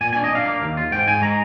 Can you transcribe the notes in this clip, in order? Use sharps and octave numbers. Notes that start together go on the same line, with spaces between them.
A#2 G#5
D4 G#5
D#5
D4 F5
A#3
D#2
F4
G#2 G5
G#2 G#5
G#3 A#5